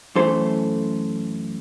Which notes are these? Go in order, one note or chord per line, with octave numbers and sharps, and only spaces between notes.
F#2 E3 A3 A4 C5